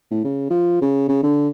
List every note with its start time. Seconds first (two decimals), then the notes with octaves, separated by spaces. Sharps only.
0.11 A2
0.24 C#3
0.50 F3
0.81 C#3
1.08 C#3
1.23 D3